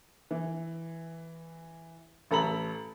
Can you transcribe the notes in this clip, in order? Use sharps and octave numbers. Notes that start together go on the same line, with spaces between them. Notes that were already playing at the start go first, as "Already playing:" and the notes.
E3
A1 A4 A#5 B5 F#7